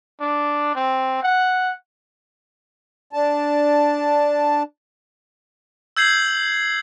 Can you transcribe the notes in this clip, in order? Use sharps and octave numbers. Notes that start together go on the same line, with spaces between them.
D4
C4
F#5
D4 A5
E6 G6 G#6 C7 F#7